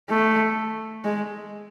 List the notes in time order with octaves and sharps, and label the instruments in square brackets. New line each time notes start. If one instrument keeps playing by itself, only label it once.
[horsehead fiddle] A3
G#3